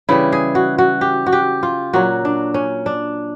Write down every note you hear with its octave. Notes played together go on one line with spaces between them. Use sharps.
C#3 E3 G3 E4
G#4
F#4
F#4
G4
F#4
G4
F4
A#2 F#3 F#4
D4
C#4
D4